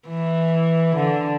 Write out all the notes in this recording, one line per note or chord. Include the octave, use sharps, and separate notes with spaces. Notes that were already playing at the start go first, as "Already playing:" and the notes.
E3
D3